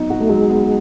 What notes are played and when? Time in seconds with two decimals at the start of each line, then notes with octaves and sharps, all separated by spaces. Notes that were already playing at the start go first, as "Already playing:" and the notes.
Already playing: F#3 B3 D#4
0.10 F#4
0.20 A3
0.29 F#3 G#3
0.50 B3